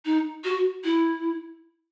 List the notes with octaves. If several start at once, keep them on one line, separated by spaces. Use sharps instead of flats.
D#4
F#4
E4